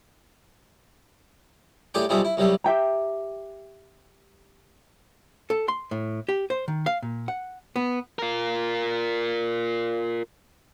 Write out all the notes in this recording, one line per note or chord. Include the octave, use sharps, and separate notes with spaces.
A2 G4 G#4 D5 C#6 D6
B1 C3 F3 G3 G#4 E5
E4
C2 F#3 G3 E5
G4 E5 G5 A#5
A4
C6
A2
G4
C5
D#3
F5
A#2
F#5
B3
F4 A#4